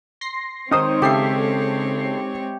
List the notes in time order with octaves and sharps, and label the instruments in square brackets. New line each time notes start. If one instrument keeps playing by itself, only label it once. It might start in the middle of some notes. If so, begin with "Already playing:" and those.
[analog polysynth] C6 A#6 C7
[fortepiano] D#3 D#6 [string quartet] G#3 C4 C#5 [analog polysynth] D#4 C5
[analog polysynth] C#3 A4 C7 [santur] G4 E5